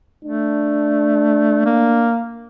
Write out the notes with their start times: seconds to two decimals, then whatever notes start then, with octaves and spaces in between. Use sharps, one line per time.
0.25 A3 D4
1.66 A#3